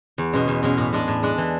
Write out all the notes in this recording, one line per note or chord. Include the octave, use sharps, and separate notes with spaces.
E2
B2 G#3 C#4
E2
B2 G#3 C#4
A2
G#3 D4
A2
G#3 D4
E3